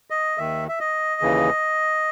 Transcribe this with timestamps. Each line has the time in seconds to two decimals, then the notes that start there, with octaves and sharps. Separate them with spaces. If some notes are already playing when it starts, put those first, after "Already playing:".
0.10 D#5
0.38 D#2 D#3 E5
0.69 E5
0.80 D#5
1.21 D#2 C#3 E3